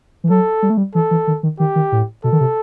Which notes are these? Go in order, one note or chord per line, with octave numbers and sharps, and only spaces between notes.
E3
F#3 A4
G3
A3
G3
E3 A4
E3
D#3
D#3
D#3 G4
D#3
A2
B2 A4
D#3
C3